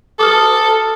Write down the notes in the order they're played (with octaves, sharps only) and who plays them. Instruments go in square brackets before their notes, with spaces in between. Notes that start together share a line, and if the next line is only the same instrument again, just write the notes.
[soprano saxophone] A4 [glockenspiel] D6 D#6 F6